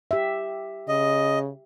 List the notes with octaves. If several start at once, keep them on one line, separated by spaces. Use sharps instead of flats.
G4 E5
C#3 D#5